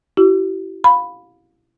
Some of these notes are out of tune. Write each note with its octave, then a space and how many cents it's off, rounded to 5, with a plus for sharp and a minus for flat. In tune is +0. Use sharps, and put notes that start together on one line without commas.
E4 +15 G4 -45
F5 +25 B5 +0